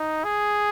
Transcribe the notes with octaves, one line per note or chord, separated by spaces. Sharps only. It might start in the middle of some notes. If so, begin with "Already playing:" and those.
Already playing: D#4
G#4